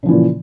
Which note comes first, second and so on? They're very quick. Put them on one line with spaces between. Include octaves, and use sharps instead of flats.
C#3 F3 E3 A#2